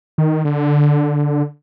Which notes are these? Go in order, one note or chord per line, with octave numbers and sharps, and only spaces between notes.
D#3
D3